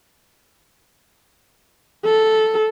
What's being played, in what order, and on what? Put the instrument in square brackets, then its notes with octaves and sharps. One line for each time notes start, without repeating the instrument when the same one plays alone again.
[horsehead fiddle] A4